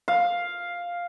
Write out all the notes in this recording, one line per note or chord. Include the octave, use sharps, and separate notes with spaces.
F5